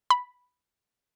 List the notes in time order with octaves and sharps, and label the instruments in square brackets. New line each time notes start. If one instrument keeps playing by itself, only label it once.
[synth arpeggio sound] B5